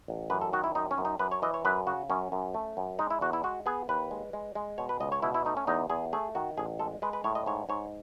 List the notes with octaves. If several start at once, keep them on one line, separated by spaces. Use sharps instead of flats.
A1
F#2 B4
A4
D#3 F#4
E4
F#2 D#4
C#4
F#2
D#4
F#2 B4
C#5
E3 D#5
C#5
F#2 B4
C#3 F#4
F#2 C#4
F#2
A3
F#2
G#3 D#4
E4
E2 F#4
E4
G#3 F#4
B3 G#4
D#2 B4
G#3
G#3
G#3
B2 C#5
B4
C#2 D#5
C#5
B2 E4
E4
A3 D#4
C#4
E2 D#4
E2 G#4
A3 G#4
D#3 F#4
A1 G#4
G#3 A4
G#3 B4
B4
A2 C#5
D#5
G#2 C#5
G#2 C#5